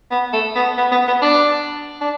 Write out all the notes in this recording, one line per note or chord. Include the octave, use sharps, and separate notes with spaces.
B3
A3
B3
B3
B3
B3
D4
D4